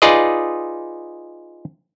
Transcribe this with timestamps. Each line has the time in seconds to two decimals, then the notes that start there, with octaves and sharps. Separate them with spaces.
0.02 D#4 F4 G#4 B4 D5 D#5